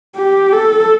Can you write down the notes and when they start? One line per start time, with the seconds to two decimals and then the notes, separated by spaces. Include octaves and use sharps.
0.16 G4
0.53 A4